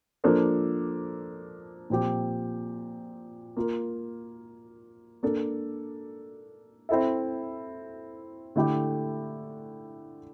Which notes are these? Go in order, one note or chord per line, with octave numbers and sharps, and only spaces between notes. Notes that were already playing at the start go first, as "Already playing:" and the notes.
F3 A#3 D4 A4 C5
A#2 F3 C4 G4
A#3 F4 A#4
A#3 D4 A4
C4 E4 A4 E5
D3 A3 E4 G4